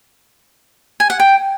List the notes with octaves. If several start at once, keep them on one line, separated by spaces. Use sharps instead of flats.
G#5
F#5
G5